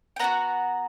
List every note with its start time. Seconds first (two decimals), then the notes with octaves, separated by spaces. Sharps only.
0.16 G5
0.19 B3 D4 F#4 F#5 A#5